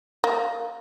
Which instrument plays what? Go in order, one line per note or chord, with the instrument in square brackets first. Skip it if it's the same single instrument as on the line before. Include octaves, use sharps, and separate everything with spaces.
[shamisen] A#3